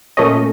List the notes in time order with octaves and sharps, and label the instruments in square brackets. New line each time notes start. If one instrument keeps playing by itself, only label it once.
[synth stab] A#2 A3 C#4 D#5